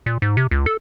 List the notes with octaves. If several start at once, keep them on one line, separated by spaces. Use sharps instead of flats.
A#2
G#2
C3
C#2
A4